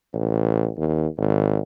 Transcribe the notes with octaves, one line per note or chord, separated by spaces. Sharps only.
A1
D#2
G#1